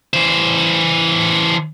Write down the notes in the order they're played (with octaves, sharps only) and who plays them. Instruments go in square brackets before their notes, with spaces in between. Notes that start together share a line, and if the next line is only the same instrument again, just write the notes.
[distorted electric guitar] E3 C5